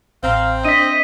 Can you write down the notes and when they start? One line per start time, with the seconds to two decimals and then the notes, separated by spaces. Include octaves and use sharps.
0.23 A1 C4 F5 A#5
0.65 D4 D#5 E5 B6 D#7